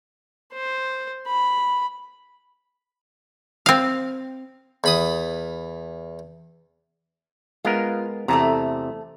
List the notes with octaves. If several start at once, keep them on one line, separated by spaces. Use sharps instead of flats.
C5
B5
C4 F5
E2 B5 D#6
G#3 B3 F4 A#4
E2 C3 A3 A5 A#5